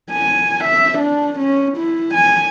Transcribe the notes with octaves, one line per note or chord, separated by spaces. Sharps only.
G#5
E5
D4
C#4
E4
G#5